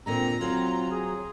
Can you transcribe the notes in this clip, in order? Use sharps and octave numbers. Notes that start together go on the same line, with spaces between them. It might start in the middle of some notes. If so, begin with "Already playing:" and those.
A#2 D3 G#3 C4 A#5
F#3 C4 F4
G#4